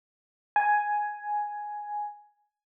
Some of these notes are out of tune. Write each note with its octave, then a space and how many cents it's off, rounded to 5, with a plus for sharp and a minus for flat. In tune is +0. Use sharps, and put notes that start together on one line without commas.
G#5 +5